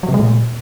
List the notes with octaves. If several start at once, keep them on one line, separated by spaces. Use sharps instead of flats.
F#3
C3
G#3
A#2